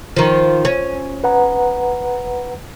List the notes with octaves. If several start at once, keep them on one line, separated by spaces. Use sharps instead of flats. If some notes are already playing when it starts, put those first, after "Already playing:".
D#3 F3
C#4
B4 F#5 A#5